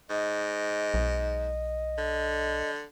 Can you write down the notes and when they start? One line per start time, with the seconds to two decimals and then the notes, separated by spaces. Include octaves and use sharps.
0.10 G#2 D#5
0.94 B1
1.98 D3